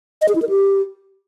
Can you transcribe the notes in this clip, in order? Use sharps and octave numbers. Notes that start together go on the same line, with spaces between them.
D#5
G#4
E4
A#4
G4